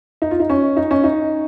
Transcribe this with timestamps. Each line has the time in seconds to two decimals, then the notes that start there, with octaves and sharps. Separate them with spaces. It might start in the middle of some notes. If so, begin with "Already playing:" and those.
0.22 D#4
0.31 F4
0.40 D#4
0.50 C#4
0.77 D#4
0.91 C#4
1.04 D#4